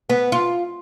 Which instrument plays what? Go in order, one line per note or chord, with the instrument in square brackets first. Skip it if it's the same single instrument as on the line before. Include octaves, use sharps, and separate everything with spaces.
[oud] B3
F4